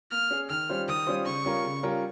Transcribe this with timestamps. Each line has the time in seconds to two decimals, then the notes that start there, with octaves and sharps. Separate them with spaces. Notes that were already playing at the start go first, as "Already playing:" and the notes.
0.11 A#3 F6
0.31 C#4 G#4
0.50 D#3 F6
0.69 G3 C#4 F4 C5
0.88 D#3 D#6
1.07 G3 C#4 F4 C5
1.25 C#3 C#6
1.45 G3 C#4 F4 A#4
1.64 C#3
1.83 G3 C#4 F4 A#4